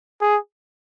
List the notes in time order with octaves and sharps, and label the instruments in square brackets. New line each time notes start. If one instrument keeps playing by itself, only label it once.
[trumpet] G#4